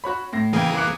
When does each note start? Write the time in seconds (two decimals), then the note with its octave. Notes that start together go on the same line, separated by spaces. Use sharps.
0.04 F#4 C#5 B5
0.33 A2 A#6
0.53 C#3 E3 A#3 G#4 G5
0.76 D6 F#6 C#7